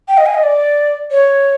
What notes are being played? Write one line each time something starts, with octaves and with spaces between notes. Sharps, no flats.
G5
D#5
G#5
D#5
D5
C#5